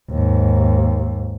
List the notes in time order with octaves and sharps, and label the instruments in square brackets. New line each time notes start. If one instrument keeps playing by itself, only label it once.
[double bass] D#2 G#2